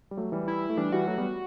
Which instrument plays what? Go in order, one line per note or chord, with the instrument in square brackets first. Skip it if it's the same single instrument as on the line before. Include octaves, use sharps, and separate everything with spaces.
[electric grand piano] G3
F#3 A3
E3 G3
[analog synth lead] E4
[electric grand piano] A3
[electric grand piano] E3 G3 [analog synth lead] D4
[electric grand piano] E3 G3 [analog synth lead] F#4
[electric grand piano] F#3 A3
G3 B3